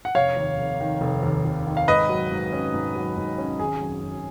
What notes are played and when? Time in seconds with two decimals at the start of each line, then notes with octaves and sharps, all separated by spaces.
0.05 F#5
0.15 F1 C#5 F5
0.37 D#2
0.58 F1
0.81 D#3
1.01 F1
1.23 D#2
1.45 F1
1.67 D#3
1.77 F5
1.88 G#2 B4 D#5
2.09 F#3
2.31 G#2
2.52 C#4
2.74 G#2
2.95 F#3
3.17 G#2
3.38 C#4
3.59 G#1 G#4
3.81 F#2
4.02 G#1